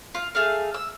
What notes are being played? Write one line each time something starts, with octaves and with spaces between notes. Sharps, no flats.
F4
A3 G#4 F5
E6